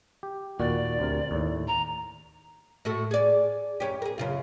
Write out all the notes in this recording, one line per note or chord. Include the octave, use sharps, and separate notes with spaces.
G4
D#2 A#2 F#4 D5
D2 C3 A#4
D#2 A2
A#5
A2 F#4 A4
G#4 D5
F#2 C#4 G4
G#4 A#4
F#2 C#3 F4